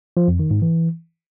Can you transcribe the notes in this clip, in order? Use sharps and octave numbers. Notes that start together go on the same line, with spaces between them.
F3
F2
D#3
G#2
E3